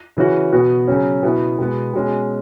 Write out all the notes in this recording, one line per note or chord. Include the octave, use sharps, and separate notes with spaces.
C#3 E3 C#4 F#4
B2 B3 F#4
C#3 F#3 C#4
B2 B3 E4
B2 G#3 B3
B2 G#3 C#4